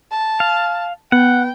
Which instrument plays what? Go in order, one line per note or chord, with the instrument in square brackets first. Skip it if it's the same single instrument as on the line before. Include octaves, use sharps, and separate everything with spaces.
[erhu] A5
[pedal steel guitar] F5
[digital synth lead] B3 [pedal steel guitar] F#5 [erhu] G5